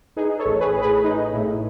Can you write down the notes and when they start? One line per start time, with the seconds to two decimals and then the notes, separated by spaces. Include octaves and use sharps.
0.16 D#4 G#4 B4
0.39 A4 C#5
0.45 A1
0.61 G#4 B4
0.75 A2
0.82 G#4 B4
1.04 D#4
1.33 A2